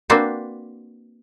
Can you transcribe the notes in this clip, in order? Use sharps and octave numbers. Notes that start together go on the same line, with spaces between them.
A#3 C4 D4 F#4 B4 C5